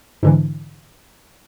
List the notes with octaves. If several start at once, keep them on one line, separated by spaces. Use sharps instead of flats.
G#2 D3 E3